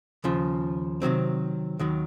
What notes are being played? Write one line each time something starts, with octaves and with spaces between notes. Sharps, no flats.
D#2 C#3 F3
C3 D#3 F#3 C4
D#2 D#3 F#3